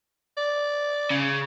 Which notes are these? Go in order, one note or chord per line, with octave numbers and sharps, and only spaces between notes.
D5
C#3